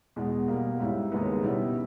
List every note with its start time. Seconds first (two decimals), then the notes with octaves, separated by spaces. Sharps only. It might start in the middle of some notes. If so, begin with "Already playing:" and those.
0.16 E2 B2 G#3
0.48 B2 G3 A#3
0.80 G#2 G3 C#4 E4
1.12 D#2 C#3 G#3 B3 D#4
1.43 B2 G3 C#4 E4